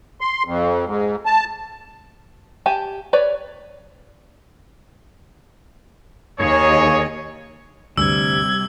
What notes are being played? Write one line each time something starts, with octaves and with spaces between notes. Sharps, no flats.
C6
F2
G#2
A5
G4 G#5 A5
B4 C#5 D5
D#2 G#4 C#5 D#5
D2 G2 C3 G3 E6 G#6